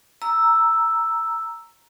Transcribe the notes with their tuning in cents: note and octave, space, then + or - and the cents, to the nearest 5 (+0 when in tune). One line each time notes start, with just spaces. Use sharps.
A#5 +0 E6 +0